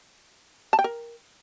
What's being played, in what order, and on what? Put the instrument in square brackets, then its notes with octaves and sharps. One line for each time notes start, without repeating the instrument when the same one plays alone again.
[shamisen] A5
G5
A#4